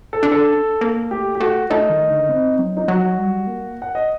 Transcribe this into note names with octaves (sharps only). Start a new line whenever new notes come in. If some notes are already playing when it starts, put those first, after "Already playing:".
A4
D4
A4
A#3
A3 G4
G4
A3 F#4
A3 D#4
D#3
D3
C4
F#3
D#4
F#3 F#4
G3
A#3
F#5
D#5